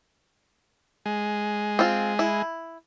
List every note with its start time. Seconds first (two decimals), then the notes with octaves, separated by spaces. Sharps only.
1.06 G#3
1.79 C4 F4
2.19 E4